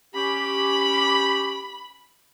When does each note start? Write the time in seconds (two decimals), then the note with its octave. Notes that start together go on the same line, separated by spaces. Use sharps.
0.15 C#4 G4 B5